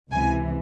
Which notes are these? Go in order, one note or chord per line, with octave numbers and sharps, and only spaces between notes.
C#2 C3 E3 G#5